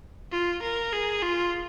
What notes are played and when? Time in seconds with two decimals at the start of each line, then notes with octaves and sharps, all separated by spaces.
0.32 F4
0.62 A#4
0.92 G#4
1.22 F4